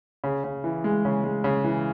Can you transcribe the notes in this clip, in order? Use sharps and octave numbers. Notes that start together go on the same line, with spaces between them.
C#3
C#3
E3
G#3
C#3
G#3
C#3
E3